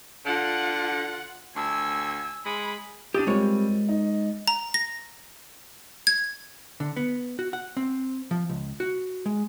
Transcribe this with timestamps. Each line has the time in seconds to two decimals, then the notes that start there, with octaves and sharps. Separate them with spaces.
0.26 D3 F4 F#5
1.56 D2 G#5 E6
2.46 G#3 B5
3.15 D4 G4 D#6 A6 D#7
3.27 G3 G#3 A#3 C4 F4 C#5
3.89 D#4
4.48 A#5
4.74 A#6
6.07 G#6
6.80 D3
6.96 B3
7.39 F#4
7.53 F#5
7.77 C4
8.31 F3
8.49 C#2
8.80 F#4
9.26 G#3